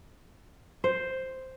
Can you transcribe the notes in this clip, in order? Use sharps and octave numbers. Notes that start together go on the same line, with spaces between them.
C5